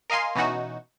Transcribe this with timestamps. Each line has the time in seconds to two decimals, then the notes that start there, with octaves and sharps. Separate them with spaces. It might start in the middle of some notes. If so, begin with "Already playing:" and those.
0.10 A#4 D#5 F5 G#5 C6
0.35 B2 E3 C#4 D#4 F#4